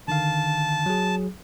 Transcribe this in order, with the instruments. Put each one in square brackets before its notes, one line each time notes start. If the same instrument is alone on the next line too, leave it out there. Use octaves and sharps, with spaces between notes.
[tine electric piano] D3 D#3 F5 [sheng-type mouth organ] A5
[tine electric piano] F#3 G#4